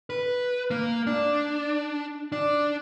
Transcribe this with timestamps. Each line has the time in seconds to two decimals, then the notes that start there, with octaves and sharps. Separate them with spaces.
0.10 B4
0.71 A#3
1.07 D4
2.32 D4